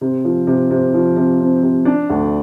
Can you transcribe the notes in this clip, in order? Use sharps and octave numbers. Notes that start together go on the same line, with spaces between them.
C3
F3
C3
C3
F3
C3
C4
C3
D4
D2